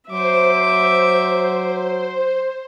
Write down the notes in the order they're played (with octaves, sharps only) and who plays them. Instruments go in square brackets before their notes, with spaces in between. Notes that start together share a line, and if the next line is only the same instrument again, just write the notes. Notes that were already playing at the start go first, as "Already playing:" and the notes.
[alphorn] F#3 [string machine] C5 [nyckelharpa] E5 D6